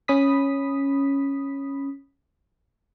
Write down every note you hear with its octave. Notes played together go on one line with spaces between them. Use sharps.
C#4 B5 D#6 B6